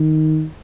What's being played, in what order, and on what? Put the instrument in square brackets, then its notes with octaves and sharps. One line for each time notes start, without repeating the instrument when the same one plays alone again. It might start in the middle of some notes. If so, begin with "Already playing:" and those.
Already playing: [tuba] D#3